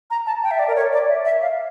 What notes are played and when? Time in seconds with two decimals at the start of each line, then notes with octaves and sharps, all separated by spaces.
0.10 A#5
0.26 A5
0.44 G5
0.51 E5
0.59 D5
0.68 A#4
0.76 C#5
0.93 D5
1.09 E5
1.25 E5
1.42 F5